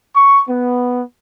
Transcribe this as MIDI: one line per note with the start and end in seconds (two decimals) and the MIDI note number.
0.16 0.43 85
0.49 1.02 59